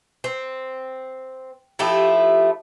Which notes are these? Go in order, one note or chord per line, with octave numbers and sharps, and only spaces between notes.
C4
F3 A3 E4 G4